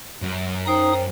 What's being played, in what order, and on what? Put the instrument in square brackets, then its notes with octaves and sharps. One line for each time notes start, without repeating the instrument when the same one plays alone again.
[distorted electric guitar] F#2
[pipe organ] D#4 D#6 [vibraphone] C5 G5 A#5